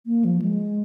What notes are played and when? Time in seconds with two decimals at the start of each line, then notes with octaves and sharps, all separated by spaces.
0.06 A#3
0.25 F3
0.42 G#3